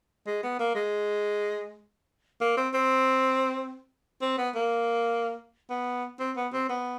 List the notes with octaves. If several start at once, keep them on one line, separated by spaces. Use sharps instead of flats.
G#3
B3
A#3
G#3
A#3
C4
C4
C4
B3
A#3
B3
C4
B3
C4
B3